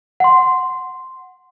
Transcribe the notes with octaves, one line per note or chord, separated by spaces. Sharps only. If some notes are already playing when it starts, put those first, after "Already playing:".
F#5 C6